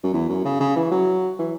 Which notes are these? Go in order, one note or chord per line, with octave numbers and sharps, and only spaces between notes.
F#2
E2
F#2
C#3
C#3
E3
F#3
E3